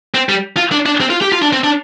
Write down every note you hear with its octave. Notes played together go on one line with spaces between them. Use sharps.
C4
G3
F4
D4
D4
C4
F4
G4
F4
D4
C4
D4